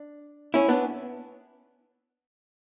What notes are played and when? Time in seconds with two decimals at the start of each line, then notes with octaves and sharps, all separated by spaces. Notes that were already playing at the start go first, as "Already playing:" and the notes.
Already playing: D4
0.54 C#4 E4
0.68 B3 D4